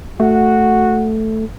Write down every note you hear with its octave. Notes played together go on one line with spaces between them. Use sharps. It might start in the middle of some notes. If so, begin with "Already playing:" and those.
A3 F#4